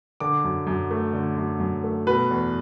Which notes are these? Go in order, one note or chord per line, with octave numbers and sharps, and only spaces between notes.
D3 D6
F#2
F#2
A3
D3
F#2
F#2
A3
B2 B4
E2